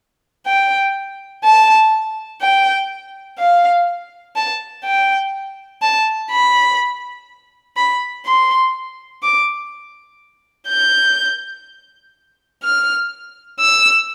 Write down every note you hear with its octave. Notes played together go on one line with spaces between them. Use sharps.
G5
A5
G5
F5
A5
G5
A5
B5
B5
C6
D6
G6
F6
E6